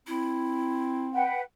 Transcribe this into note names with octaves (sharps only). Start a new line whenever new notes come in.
C4 E4
B4 F#5 G5